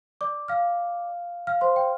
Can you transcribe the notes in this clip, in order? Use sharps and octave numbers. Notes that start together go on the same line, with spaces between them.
D5 D6
F5 F6
F5 F6
C5 C6
G5